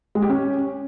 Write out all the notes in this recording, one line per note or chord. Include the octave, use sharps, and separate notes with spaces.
G#3
G4
C#4